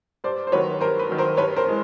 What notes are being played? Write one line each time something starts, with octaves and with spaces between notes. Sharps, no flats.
G2 C5 D5
C5
D#3 F#3 B4 C#5
G2 A#4 C5
B4
D#3 F#3
A#4 C5
G2 B4 C#5
A#4 C5
E3 G#3